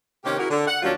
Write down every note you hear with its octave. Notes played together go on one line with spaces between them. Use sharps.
C3 D#3 A#3 C#4 G4
E4 F#4 G#4 A#4
D3
F#5
D#2 F#3 G3 C#4 D4 F4